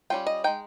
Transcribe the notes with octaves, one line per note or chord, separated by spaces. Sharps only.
G3 C#4 F4 G5
D#5
G#3 D#4 G5